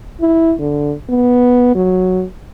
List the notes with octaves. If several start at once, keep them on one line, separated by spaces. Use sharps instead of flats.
E4
D3
B3
F#3